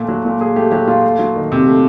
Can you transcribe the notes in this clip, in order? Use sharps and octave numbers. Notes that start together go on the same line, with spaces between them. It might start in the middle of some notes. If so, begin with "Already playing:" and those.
Already playing: A#2 A3 A4
F#3
A#2
A#2 G#4
A3 G4
F#3 G4
A#2 F4
A3
F#3
D#3
C3
A3